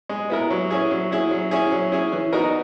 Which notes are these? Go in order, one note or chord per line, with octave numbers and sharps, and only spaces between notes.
G#3
B3 E4 A#4
F#3
C#4 E4 G#4
F#3
C#4 E4 G#4
F#3
C#4 E4 G#4
F#3
C#4 E4 G#4
E3
B3 D#4 F#4 A#4